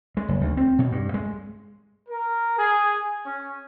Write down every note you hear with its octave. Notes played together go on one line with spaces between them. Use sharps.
G#3
F#1
D2
C4
B2
G2
G#3
A#4
G#4
C#4